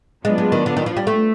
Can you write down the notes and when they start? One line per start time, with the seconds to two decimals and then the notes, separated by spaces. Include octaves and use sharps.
0.24 F#3 G#3 B3 D4 F4
0.38 G#3
0.52 D#3
0.66 D3
0.77 D#3
0.86 F3
0.97 G3
1.07 A3